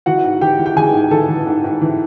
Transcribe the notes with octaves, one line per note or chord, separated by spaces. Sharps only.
E3 F#4 F#5
G#2
E3 G4 G5
E3
G5
E3 G#4 G#5
G#2
E3 A4 A5
E3
G#2
G#2
E3